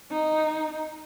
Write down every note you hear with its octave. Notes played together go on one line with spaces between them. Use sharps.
D#4